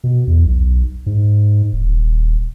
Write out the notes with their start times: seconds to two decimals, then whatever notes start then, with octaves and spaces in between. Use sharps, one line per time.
0.04 B2
0.27 E2
0.45 B1
1.06 G#2
1.73 D#1